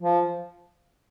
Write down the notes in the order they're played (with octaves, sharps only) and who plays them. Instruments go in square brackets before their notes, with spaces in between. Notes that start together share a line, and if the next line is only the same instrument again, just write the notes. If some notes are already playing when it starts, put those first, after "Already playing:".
[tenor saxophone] F3